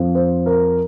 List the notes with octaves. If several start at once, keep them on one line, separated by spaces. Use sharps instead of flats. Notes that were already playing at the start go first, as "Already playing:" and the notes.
Already playing: F2 F3
C5
A#4